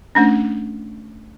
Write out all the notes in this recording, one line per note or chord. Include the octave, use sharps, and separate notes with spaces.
A3 C#4 D4